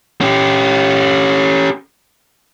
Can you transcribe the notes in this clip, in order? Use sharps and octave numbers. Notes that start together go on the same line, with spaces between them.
C#4 G4